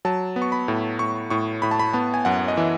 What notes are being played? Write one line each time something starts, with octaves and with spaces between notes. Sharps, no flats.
F#3 A5
B3
C#6
B5
A2
A2 C#6
A2 C#6
A2 B5
A5
B5
B3 A5
G#5
F#2 F#5
D#5
E3 E5